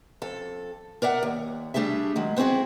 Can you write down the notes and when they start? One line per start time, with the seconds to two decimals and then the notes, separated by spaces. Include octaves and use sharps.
0.22 F2 A4
1.02 A#4 D5 E5 F#5
1.23 D#2
1.74 G3 A3 D4 G#4 E5
2.16 D#3 F#3 G#3
2.36 B3 C4 E4 F#4 G#4